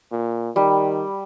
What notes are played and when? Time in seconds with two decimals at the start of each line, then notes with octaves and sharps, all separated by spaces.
0.12 A#2
0.56 D#3 G3